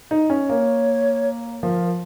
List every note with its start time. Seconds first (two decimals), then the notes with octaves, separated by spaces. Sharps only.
0.11 D#4
0.30 C#4
0.49 A#3 C#5
1.63 F3 A#4